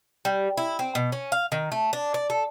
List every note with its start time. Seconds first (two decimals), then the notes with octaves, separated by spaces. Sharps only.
0.25 G3
0.57 E4
0.79 C4
0.95 B2
1.12 C#4
1.32 F5
1.52 D#3
1.72 A3
1.93 D4
2.14 D5
2.30 A4